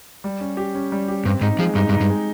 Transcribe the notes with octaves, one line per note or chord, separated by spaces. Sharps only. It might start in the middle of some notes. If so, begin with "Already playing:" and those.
G3
C#4
G4
C#4
G3
G4
G2 C4
G#2 D#4
F3 G#3
G2 D#4
G2
D#4
G2
G#3